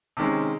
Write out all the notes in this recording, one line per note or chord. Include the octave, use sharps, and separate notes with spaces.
C3 D#3 G#3 C#4